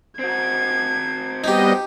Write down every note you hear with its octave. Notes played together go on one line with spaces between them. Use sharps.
C4 F#4 G#6
G3 B3 D#4 G4 D#5